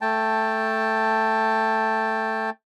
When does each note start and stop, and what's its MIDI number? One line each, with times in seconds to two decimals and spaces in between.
0.01 2.50 57
0.01 2.50 79
0.01 2.50 81